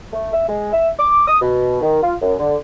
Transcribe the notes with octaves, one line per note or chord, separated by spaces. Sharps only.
A3
E5
G#3
E5
D6
D#6
B2
D#3
F4
F#2
D3